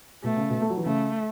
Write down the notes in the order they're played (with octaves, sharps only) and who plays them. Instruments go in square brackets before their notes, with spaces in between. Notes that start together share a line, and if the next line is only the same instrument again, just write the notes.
[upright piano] B2 [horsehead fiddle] A3
[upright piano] C#3
B2
A3
F#3
E3
[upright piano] C#3 [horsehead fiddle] A3